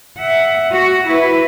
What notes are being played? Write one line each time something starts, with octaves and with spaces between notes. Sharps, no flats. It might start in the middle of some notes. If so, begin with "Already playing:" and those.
E5 F#5
F#4
E4 B4